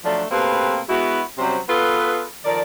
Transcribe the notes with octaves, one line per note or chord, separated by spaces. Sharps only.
F3 F#3 A3 D4
B2 A3 A#3 C4 G4 B4
G#3 B3 E4 F#4
C3 F#3 G3 C#4 C5
B3 F4 G#4 A4 B4
D#3 F3 A4 A#4 D5